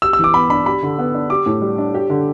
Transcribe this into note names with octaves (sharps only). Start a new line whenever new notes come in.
G4 E6
E6
E3 D6
B3 B5
D4 B5
G4 B5
D3
B3
D4
G4 D6
A2
G3
D4
G4
D3